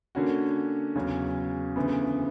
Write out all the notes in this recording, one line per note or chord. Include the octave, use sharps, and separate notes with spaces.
D3 A#3 C#4 F#4
E2 C#3 F#3 C#4
D2 C#3 E3 B3